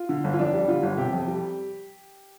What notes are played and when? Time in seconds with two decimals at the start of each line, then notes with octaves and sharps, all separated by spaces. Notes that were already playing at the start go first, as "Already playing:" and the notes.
Already playing: F4
0.09 D3
0.24 G1
0.33 F4
0.39 F2 D4
0.54 G3
0.68 D3 F4
0.83 G1
0.97 C3 G4
1.13 F2
1.28 G3